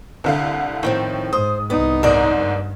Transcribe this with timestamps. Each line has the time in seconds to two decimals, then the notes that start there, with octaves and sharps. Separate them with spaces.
0.24 C2 D3 F5
0.83 A2 D#3 F3 C4
1.33 G#2 C5 D#6
1.70 C2 B3 D#4
2.03 F#1 G#2 A#4 D5
2.36 G2